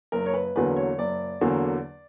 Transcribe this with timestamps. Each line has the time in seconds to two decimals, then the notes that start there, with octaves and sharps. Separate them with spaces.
0.12 F#1 A#4
0.26 C#5
0.34 B4
0.56 E2 D3 F#3 A#3 B4
0.77 C#5
0.98 F#1 D5
1.41 E2 D3 F#3 A#3